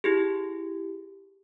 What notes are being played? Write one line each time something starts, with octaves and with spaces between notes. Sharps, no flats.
E4 G4 G#4